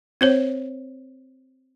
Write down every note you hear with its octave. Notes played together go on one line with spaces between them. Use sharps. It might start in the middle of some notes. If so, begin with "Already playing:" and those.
C4 C5 C#5